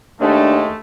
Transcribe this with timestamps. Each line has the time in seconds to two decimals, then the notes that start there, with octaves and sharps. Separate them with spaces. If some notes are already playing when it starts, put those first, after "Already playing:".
0.21 D#2 G#3 A3 D4